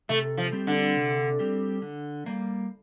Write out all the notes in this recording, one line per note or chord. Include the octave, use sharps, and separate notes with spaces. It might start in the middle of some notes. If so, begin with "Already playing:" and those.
C3 A3
F3
G3 C4 G4
D3
C3
G3 C4 G4
D3
G3 A#3